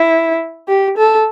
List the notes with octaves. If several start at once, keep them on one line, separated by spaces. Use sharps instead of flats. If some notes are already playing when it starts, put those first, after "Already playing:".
Already playing: E4
G4
A4